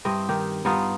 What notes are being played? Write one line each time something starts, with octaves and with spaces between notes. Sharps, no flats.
G2 C4 E4 D#5
D#3 G4
G2 B3 D#4 F4